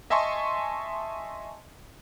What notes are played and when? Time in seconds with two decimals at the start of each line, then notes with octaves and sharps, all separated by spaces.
0.10 D#5 E5 G#5 A5 C6 C#6